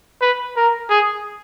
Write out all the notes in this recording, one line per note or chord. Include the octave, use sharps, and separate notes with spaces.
B4
A#4
G#4